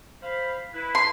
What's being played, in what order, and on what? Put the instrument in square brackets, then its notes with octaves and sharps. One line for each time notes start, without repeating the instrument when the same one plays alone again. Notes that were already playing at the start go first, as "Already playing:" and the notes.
[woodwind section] C5 F5 B5
E4 B4
[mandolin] C6